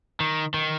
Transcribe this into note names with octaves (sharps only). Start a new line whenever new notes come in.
D#3
D#3